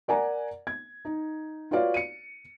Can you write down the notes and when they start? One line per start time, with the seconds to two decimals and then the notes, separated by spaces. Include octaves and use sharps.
0.08 A#4 D5 F#5 G#5 A#5
0.67 G#6
1.05 D#4
1.71 F4 F#4 B4 C#5 D5 F5
1.94 C#7 D#7